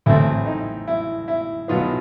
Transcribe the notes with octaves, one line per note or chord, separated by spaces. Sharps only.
A1 A2 E3 A3 C4 E4
D#4
E4
E4
B1 B2 F#3 B3 F4